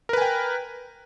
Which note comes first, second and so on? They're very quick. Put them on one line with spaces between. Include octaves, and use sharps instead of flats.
A#4 B4 G#5 G5